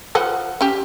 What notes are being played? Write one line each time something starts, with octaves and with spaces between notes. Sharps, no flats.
F3 B4 F#5
C#4 G4